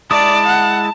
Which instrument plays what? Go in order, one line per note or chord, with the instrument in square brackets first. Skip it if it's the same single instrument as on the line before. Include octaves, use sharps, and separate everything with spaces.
[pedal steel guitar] G#3 E4 D#6 [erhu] D5 [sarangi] A5
[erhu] F#5